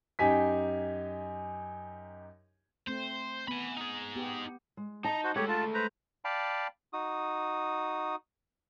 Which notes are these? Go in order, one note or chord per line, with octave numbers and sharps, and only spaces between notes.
F#2 D#4 G4 G#5 B6
A3 C4 C5
B3 G#5 B5
D#4 G#4
B3 G4
G#3
D#4 A5 A#5
F#4 C5
G#3 A3 G4 A4 C#5 F#5
F4 A5
B4 C5 A#5
D5 F5 G5 A5 B5
D#4 F#4 D#6